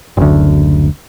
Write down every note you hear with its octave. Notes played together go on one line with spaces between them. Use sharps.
F#1 D2